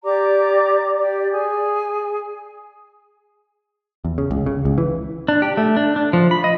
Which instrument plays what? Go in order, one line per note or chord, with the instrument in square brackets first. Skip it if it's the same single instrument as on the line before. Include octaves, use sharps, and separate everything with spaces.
[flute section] G4 D5 A#5 D6
G4 D5
G#4 G#5
[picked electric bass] E2
C#3
C#2
C#3
C#2
E3
[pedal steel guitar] D4
G4
A3
D4
D4
F3
B5
D#5